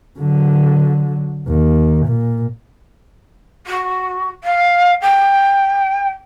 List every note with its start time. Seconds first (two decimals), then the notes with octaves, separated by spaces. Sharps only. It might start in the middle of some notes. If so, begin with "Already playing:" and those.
0.19 D3 F#3
1.48 D#2
2.06 A#2
3.66 F#4
4.43 F5
5.01 G5